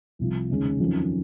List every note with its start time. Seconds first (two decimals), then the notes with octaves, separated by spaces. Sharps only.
0.19 C2 C3 F3
0.49 D#2 C#3 G#3 C#4
0.80 F2 D#3 F#3 C#4 F4